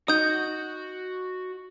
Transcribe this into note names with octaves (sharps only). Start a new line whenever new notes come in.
D#4 F#4 D#6 G6